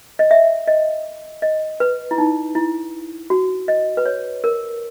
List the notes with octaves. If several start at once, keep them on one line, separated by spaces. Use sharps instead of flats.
D#5
E5
D#5
D#5
B4
E4
D#4
E4
F#4
D#5
B4
C#5
A#4